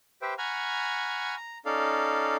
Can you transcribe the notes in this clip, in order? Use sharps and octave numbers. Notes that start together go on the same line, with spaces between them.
G4 B4 C5 E5 G5
F#5 G#5 A#5 B5 C#6 F6
A#5
C#4 D#4 A4 D5 F5